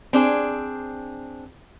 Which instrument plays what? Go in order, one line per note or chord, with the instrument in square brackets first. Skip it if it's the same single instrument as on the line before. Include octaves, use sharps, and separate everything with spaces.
[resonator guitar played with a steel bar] C4 D4 G#4